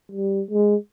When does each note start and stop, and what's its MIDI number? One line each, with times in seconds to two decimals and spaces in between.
0.12 0.42 55
0.51 0.76 56